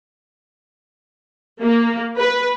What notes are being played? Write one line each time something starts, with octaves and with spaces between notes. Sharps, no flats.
A#3
B4